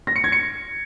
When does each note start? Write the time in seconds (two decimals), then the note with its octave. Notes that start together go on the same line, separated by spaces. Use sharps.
0.07 A#6
0.16 C#7
0.24 G#6
0.32 C#7